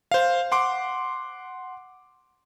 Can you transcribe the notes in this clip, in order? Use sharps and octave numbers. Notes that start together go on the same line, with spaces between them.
C5 F5
F#5 C6 D6